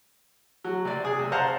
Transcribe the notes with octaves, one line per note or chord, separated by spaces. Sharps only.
F#3
C3 D5
G#4
C3
C5 F5 F#5 A5 A#5